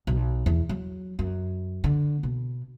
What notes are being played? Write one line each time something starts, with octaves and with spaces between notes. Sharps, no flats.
B1
E2
F#3
F#2
D3
B2